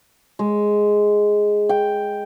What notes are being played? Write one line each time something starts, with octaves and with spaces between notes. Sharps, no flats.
G#3
G5